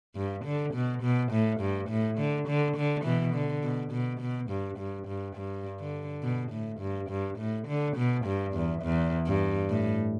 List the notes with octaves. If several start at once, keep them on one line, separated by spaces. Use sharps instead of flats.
G2
D3
B2
B2
A2
G2
A2
D3
D3
D3
B2 E3
D3
B2
B2
B2
G2
G2
G2
G2
D3
B2
A2
G2
G2
A2
D3
B2
G2
E2
E2
G2
A2